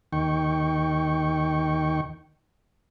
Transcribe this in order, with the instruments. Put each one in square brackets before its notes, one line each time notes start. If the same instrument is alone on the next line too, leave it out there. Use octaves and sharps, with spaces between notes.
[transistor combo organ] D#2 D#3 G5 C#6